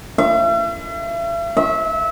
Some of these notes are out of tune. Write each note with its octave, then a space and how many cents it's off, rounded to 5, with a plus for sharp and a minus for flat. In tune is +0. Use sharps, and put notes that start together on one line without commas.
E5 +45
E5 -25